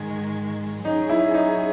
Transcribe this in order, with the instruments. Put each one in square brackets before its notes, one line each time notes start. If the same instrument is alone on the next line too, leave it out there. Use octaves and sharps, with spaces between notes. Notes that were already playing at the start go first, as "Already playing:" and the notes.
Already playing: [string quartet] G#2 D#3 G#3
[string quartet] F#3 C#4 G#4 [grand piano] D#4
[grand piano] E4
D#4